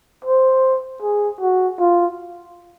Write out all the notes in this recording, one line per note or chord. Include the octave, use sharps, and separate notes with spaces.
C5
G#4
F#4
F4